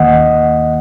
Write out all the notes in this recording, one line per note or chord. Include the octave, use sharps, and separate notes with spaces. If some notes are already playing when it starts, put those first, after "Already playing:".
Already playing: D#2 D#3 A#3 D#5 F#5